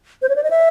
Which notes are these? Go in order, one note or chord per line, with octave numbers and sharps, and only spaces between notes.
C5
C#5
D5
D#5
E5